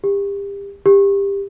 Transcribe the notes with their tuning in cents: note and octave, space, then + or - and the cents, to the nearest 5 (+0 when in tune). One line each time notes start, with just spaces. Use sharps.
G4 +30
G4 +20